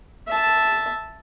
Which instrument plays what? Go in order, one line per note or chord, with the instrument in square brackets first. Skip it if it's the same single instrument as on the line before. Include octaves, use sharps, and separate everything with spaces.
[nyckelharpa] E5 A5